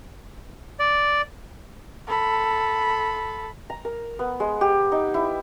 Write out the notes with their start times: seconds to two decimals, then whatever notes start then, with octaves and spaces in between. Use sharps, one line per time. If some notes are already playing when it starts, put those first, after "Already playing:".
0.79 D5
2.07 A4 B5
3.70 A#5
3.85 A#4
4.19 B3
4.40 G#3
4.61 G4
4.92 D#4
5.14 E4